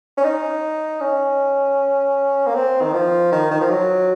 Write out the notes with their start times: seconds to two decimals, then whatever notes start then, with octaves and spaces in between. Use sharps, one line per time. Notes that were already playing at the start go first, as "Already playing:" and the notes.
0.18 C#4
0.24 D#4
1.01 C#4
2.47 A#3
2.55 C4
2.81 D#3
2.93 F3
3.32 D#3
3.51 D#3
3.61 F3
3.70 F#3